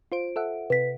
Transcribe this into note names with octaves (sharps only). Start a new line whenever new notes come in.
F4 C5 D7
A4 E5 F#5
C3 B4 B6